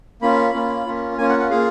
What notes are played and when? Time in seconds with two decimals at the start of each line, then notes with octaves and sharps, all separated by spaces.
0.22 A#3 C#4 F4 B5
0.54 A#3 C#4 F4
0.86 A#3 C#4 F4
1.18 A#3 C#4 F4 G#5
1.29 F#5
1.40 F#5
1.50 A#3 F4 G#4 F5